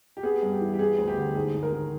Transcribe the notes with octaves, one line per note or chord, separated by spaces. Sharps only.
G4
B3 G#4
G2
G4
E3
G4
B3 G#4
D2
G4
D3
G#2 G#4
G#2
A#4
D#3